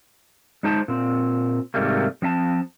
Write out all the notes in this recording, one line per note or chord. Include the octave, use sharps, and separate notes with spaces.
G#3 D#4 C5 A5
A#2 C4
G#2 C3 D#3 G3 A3 A#3
F3 C4 E5 A5